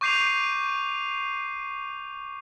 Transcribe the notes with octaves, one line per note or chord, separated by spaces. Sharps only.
C#6 D6 G6 C7 D#7 F7